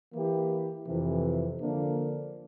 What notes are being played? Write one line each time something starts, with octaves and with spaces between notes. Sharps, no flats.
E3 A#3 E4 G4
F2 C3 E3
D3 F3 A#3 D4